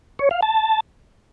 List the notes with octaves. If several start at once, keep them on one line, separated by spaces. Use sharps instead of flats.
C#5
F5
A5